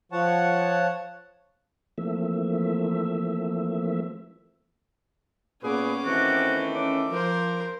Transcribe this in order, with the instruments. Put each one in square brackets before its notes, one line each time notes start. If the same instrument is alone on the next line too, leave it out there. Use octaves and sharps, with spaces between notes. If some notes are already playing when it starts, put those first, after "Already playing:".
[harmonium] F3 C#5 F#5 A5
[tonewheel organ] E3 F3 A3 A#3 C4 E5
[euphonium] A#2 [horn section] B3 G#4 B4 [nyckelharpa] C#4 D6
[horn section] D#3 E3 A3 [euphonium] C4 [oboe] F#4
[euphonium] C#4 [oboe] D6
[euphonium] F3 [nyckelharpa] A#4 C5